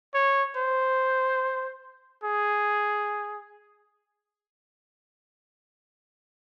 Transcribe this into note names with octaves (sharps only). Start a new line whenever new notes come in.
C#5
C5
G#4